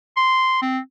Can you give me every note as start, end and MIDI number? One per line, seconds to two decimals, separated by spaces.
0.17 0.60 84
0.62 0.79 60